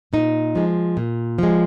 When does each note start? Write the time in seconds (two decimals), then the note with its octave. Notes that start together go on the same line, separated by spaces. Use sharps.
0.13 A#2 D#4
0.55 F3 G#3
0.97 A#2
1.39 F3 G#3